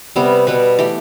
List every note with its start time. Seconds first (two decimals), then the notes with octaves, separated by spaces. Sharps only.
0.16 C3 G3 B3
0.47 B2 G3 B3 B4
0.79 E3 A3 G4